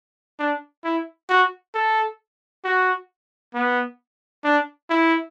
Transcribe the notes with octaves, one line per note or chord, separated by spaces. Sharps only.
D4
E4
F#4
A4
F#4
B3
D4
E4